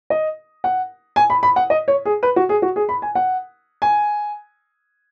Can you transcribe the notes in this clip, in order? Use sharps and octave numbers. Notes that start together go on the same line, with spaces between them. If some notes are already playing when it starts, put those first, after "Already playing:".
D#5
F#5
G#5
B5
B5
F#5
D#5
C#5
G#4
B4
F#4
G#4
F#4
G#4
B5
G#5
F#5
G#5